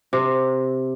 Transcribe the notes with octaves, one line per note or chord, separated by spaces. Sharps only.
C3